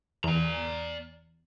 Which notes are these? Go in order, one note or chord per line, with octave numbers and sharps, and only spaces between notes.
E2 D5 A#5